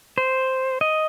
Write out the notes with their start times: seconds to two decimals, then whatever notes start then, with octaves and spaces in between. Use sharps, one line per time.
0.18 C5
0.81 D#5